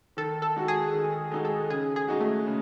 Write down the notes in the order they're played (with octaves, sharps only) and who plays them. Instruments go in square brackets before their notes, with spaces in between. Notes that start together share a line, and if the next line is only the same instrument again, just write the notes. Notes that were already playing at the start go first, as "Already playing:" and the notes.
[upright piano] D#3 [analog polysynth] A4
[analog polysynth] A4
[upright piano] G#3 D#4 F#4
[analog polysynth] G#4
[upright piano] D#3
G#3 D#4 F#4
[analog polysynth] A4
[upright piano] C#3 [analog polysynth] G#4
[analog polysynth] G#4
[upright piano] G#3 D#4 F#4
[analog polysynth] A3
[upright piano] C#3